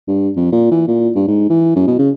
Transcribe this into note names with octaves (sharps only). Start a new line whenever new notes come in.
G2
F2
A#2
E3
A#2
G2
G#2
E3
F#2
B2
C#3